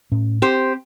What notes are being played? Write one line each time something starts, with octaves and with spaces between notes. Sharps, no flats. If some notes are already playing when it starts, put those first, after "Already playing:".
A2 C#4
C4 G4 C5